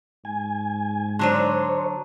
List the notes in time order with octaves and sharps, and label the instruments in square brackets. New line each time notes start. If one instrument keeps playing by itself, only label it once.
[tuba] G#2 [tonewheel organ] G#5
[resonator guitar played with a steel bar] D3 F#3 D4 [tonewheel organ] C5 C#5 [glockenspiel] A5 A#5 D#7